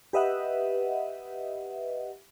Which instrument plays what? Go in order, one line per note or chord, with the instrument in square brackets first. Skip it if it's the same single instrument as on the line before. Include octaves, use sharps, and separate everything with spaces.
[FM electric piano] G4 B4 D#5 E5 F#5